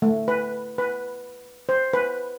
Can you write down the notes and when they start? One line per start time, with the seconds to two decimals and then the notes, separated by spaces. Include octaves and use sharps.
0.02 A3
0.28 B4
0.78 B4
1.69 C5
1.93 B4